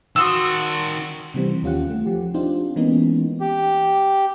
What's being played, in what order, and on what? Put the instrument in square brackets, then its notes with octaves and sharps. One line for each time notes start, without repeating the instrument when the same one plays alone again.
[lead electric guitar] D#3 C6 [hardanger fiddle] F#4 [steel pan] D#6 E6
[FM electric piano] C3 E3 G3 C4
D#2 C#4 F4 G4 F#5
A3
F3 G4
C4 D4 D#4 F4 G4 C5
E3 G#3 A#3 B3 C#4 D#4
[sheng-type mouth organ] G4